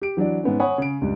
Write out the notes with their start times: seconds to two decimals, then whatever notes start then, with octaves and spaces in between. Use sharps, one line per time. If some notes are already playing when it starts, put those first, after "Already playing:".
0.02 G4 D7
0.17 E3 F#3 D4 D5
0.43 G#2 B3 C#4
0.60 C#5 F#5 G#5 B5 D#6
0.78 C#3 D7
1.01 C#2 G2 G3